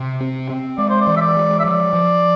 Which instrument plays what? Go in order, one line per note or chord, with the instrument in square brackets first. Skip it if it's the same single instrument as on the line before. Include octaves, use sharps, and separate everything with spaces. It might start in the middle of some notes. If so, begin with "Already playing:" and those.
Already playing: [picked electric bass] C3
C4
C4
[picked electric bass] G#3 [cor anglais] D5
[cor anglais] C5
D5
[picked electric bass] E3
[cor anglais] E5
D5
[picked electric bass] G#3
[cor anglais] E5
[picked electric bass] F3 [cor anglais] D5
[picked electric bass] F3